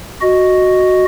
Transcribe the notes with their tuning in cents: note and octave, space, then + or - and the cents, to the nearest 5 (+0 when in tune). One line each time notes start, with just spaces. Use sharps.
F#4 +0 D#5 +0